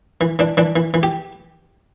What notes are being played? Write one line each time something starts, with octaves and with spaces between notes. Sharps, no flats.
E3
E3 D4
E3 D4
E3
E3
G4